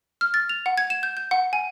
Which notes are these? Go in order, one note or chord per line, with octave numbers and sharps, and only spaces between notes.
F6
A6
F7
F#5
G#6
E7
G6
G6
F#5
G#5